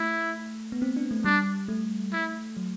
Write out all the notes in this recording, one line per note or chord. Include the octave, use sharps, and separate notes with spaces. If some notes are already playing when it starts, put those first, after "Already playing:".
Already playing: A3 E4
B3
C4
D4
A3
G3 D4
A3
E4
F#3